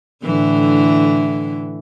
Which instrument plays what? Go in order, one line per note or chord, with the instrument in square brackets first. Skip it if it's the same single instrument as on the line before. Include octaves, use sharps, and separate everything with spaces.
[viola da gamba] A2 D3 E3